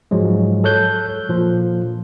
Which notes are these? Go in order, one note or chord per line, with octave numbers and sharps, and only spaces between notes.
G#2 F3 F#3 G#3
A4 C#5 F#6 G6
A#2 F3